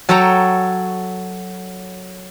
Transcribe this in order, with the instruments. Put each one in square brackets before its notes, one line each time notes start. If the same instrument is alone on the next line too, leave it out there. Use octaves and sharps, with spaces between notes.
[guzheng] F#3 A4 C#5 G5 A#5